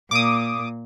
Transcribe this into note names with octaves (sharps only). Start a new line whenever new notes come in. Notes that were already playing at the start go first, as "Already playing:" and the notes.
A#2 D6 D#6